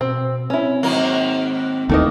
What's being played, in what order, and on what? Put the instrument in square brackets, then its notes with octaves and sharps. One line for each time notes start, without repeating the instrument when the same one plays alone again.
[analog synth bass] B2 [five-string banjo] C4
[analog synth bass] C4 [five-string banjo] C#4 E4
[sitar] G#2 D#3 A#3 [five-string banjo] F#3 A#5
[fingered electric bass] D#2 D#3 E3 [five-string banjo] A3 A#3 D#5